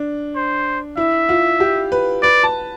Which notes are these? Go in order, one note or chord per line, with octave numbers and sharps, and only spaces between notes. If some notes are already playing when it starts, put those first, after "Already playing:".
Already playing: D4
C5
E4 E5
F4
G4
B4
B4 D5
A5